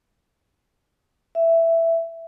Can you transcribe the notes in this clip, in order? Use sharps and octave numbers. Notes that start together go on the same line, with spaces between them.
E5